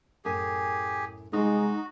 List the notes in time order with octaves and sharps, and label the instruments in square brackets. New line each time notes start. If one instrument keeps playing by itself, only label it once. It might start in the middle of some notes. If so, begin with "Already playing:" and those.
[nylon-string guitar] F#2 A2 G#5 [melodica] G4 G#4
[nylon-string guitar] C3 G3 C5 [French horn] G#3 [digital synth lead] D#4 [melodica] F#4